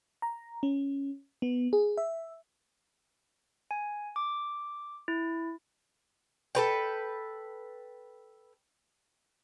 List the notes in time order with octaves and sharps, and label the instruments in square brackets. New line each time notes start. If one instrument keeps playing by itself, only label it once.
[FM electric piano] A#5
C#4
B3
G#4
E5
[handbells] G#5
D6
E4
[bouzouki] A4 B4 G5